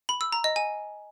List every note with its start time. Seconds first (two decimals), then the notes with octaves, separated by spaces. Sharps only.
0.09 B5
0.21 E6
0.32 A#5
0.44 D#5
0.56 G#5